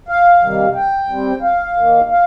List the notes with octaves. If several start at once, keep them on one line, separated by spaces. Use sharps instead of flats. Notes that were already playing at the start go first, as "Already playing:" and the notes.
F5
C3 D#3 G3 A#3
G5
C3 G3 C4
F5
D#3 A#3
F5